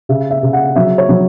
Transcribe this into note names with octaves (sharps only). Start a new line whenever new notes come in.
C#3 E5
E5
C#3
F#5
F#3 E5
C#5
F#3